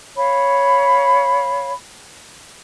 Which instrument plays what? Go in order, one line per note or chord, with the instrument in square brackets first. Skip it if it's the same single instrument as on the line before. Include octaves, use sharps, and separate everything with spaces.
[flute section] C#5 F5 B5